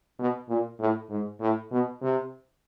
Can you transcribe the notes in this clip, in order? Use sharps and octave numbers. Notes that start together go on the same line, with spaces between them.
B2
A#2
A2
G#2
A2
B2
C3